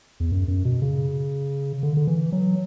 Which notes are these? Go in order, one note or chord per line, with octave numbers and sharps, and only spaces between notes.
E2
F#2
F#2
B2
C#3
D3
D3
E3
F#3